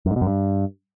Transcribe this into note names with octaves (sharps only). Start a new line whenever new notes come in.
F#2
G#2
B2
F#2
G2